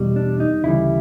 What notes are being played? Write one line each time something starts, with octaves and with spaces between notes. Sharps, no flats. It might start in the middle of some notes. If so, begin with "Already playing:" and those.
Already playing: E2 B2 G3
D4
D#4
D2 C#3 E3 G3 E4